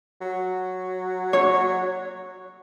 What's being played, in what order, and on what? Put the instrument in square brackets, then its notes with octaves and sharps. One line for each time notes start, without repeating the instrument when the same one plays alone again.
[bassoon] F#3
[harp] C#5